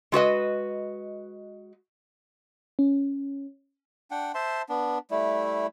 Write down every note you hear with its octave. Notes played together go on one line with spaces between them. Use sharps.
G#3 F#4 B4 D#5
C#4
D4 F#5 G5
C5 E5 A5 C6
B3 D4
G3 A3 E4